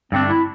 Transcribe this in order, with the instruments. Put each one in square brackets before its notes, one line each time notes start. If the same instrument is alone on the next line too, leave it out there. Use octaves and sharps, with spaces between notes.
[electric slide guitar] G2 D3 A3 D4 [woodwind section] C4
[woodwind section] E4